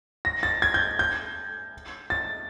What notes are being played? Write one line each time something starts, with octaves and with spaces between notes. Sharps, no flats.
A#6
A6
G#6
G6
G6
A6